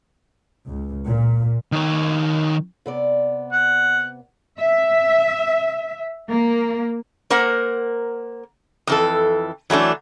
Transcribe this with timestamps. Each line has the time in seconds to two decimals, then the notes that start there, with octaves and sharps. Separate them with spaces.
0.66 C#2
1.07 A#2
1.72 D#3 C#5
2.86 C3 B3 D5
3.52 F#5
4.59 E5
6.29 A#3
7.30 A#3 A#4 C5 F#5
8.87 F2 E3 A4
9.70 E3 F#3 A3 D4